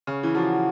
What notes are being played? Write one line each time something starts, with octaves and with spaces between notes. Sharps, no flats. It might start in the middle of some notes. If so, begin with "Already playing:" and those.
C#3 C#4
E3
F3 F#4 A#4 D5